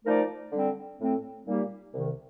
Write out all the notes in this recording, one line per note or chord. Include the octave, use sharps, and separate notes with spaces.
F3 A3 D#4 A#4 D5
D3 G3 C4
A2 A3 C4
A#2 G3 A#3 D#4 G4
C2 C3 D#3